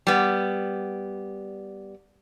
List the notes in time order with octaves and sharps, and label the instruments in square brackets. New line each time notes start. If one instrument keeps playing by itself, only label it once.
[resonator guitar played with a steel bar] G3 B3